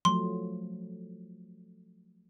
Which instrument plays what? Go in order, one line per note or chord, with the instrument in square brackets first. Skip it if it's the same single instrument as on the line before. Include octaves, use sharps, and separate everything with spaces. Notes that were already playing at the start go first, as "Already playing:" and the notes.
[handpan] F3 F#3 A3 [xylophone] C6